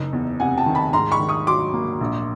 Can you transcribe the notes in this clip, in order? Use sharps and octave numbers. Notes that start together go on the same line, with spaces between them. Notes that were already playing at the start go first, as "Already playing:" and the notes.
Already playing: F#1 D#4
E2
C3 F#5 G#5
G5 A5
D#3
A5 B5
G#2 A#5 C6
B5 C#6
D#3
C#6 D#6
F#3 C6 D6
A#3
A#1